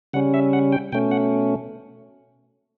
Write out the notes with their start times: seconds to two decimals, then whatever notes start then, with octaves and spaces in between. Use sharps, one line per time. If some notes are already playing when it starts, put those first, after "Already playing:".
0.14 C#3 G3 C#4 F#5
0.34 E5
0.53 F#5
0.72 G5
0.92 B2 A3 C#4 G5
1.11 F#5